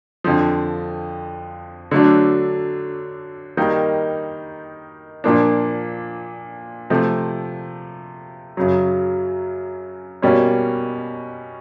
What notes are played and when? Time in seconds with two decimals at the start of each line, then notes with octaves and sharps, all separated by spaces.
0.24 F2 D3 F3
1.91 D3 F#3 A3 D4
3.57 D#3 G3 A#3 D#4
5.24 A#2 F3 A#3 D4
6.90 C3 F3 A3
8.57 F#2 C#3 F#3
10.22 B2 G3 A#3 C#4